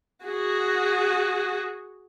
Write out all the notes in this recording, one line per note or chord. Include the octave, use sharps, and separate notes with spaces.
F#4 G#4